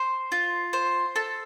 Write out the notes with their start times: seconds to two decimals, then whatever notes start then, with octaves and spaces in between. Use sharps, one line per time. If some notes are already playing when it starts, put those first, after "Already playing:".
Already playing: C5
0.32 F4
0.73 C5
1.16 A4